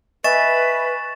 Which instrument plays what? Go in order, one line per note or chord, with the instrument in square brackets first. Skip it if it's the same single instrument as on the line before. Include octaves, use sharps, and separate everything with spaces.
[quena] B4 [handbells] D#5 E5 G#5 [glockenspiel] C#6 A6 E7